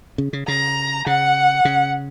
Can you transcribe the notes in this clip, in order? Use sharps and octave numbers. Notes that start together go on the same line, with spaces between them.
C#3
C#3
C#3 A#5
C#3 F#5
C#3